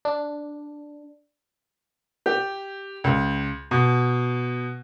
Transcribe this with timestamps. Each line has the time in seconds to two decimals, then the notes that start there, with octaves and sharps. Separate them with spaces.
0.05 D4
2.26 G4
3.04 C#2
3.71 B2